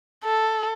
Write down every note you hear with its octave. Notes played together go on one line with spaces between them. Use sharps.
A4